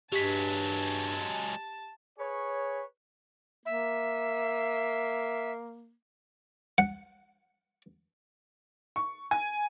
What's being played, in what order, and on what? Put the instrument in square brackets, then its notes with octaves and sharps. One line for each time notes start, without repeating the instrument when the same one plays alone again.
[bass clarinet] G2 [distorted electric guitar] F#3 G#3 [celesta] G4 B6 [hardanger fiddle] A5
[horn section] G#4 B4 C#5
[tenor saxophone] A#3 [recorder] E5
[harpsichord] F#5
[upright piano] C#6
G#5